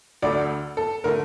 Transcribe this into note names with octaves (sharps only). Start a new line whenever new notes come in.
D2 D3 A3 D5
A4
D3 A3 A#4